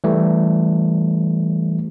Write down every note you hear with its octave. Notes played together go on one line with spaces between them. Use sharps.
E3 G3 A3